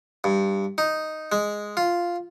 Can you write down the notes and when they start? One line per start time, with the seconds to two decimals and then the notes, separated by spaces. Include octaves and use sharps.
0.24 G2
0.78 D#4
1.32 G#3
1.77 F4